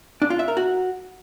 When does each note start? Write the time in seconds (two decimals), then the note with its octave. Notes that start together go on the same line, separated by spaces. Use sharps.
0.22 D4
0.30 F4
0.39 E5
0.48 A#4
0.57 F#4